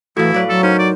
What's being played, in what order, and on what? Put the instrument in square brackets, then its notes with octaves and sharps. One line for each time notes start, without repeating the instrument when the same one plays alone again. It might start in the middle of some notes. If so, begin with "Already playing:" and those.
[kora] A2 F#3 [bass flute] E3 [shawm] E4 [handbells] F#4 F5
[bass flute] F#3 [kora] B4 D5 [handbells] F5
[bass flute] F#3 [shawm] A4
[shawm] C#4 [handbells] D#4 A#4 [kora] C5
[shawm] D5